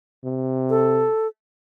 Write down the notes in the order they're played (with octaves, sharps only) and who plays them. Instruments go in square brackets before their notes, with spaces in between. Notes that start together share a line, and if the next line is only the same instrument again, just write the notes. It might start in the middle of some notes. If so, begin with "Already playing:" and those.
[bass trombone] C3
[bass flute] A4